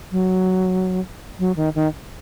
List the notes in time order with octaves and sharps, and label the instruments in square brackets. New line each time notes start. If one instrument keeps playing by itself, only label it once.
[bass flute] F#3
F#3
D#3
D#3